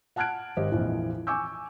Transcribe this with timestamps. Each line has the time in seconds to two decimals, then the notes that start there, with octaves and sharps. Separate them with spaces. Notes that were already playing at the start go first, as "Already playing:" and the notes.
0.16 F#5 A5 F6 F#6 G#6 D7
0.57 G#1 G4 C5 D#5
0.71 A#1 F2 E3 F3
1.27 G#5 C#6 D6 E6 G6